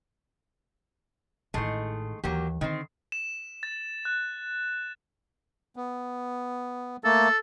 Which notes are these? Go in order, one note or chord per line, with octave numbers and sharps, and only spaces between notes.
A1 D#3 G#3 A3 E4
D#2 E3 F#3 A#3 G4
D3 D#3 C4
E7
A6
F#6
B3
A3 A#3 A4